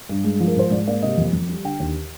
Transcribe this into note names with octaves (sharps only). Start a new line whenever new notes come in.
G2
G#3
F3
A#4
G#2 C5
G#2 D5
A#3 D5
C3 D#5
F2
F2
G3
D3 G5
D#2